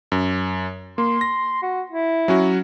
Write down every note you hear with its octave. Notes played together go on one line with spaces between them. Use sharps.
F#2
A#3 C6
A#6
F#4
E4
F#3 C#4 F#4